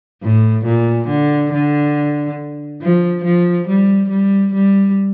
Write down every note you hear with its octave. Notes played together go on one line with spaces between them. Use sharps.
A2
A#2
D3
D3
F3
F3
G3
G3
G3